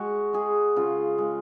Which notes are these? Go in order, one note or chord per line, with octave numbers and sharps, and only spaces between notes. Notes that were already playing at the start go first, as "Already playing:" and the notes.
Already playing: G#3 F#4
G#3 G#4
C#3 F4
G#3